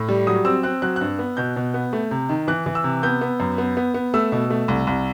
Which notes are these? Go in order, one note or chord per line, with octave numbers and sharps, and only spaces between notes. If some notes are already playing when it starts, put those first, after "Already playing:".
Already playing: A2
G3
F#3 D#6
C4 E6
C4 F#6
F#3 F#6
F#6
G2
B3
B2 G6
B2
B3
A3
C3
D#3
E3 F#6
E3
E6
C3
B3 G6
B3
F#2
B3
B3
B3
A3 E6
B2
A3
C2
C2